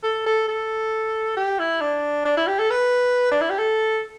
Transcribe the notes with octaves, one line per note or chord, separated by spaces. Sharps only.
A4
A4
A4
G4
E4
D4
D4
E4
G4
A4
B4
D4
E4
G4
A4